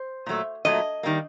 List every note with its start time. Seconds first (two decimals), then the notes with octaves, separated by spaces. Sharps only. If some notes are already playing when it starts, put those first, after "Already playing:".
Already playing: C5
0.26 A#2 F#3 A3
0.65 A#2 F#3 A3 D#5
1.03 D#3 G3 A#3